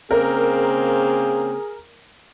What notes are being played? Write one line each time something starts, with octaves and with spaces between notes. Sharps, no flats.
C#3 A#3 C4 G#4 A#4